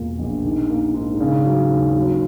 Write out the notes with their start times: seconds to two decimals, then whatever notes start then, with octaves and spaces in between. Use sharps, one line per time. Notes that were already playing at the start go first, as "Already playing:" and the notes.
Already playing: E1 A#2 A#3
0.19 A#1
0.44 D#3
0.69 A#3
0.94 G#2
1.20 C#3
1.45 F#3
1.71 D#2
1.95 F#3